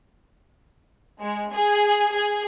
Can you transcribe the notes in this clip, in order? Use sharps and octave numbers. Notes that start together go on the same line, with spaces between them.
G#3
G#4
G#4